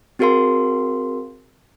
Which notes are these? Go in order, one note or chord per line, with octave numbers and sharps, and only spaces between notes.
C4 F#4 G#4 A#4 F5 C6